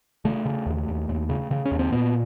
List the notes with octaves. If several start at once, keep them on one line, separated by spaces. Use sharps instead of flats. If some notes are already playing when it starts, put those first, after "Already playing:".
C#3 A3
C#3
D#2
D#2
D#2
C#3
C#3
C#4
D#2
C4
A#2 B3